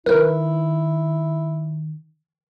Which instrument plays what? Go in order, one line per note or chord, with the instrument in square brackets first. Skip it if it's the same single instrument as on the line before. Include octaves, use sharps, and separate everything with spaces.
[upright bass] D#3 [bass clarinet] E4 [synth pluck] A#4 B4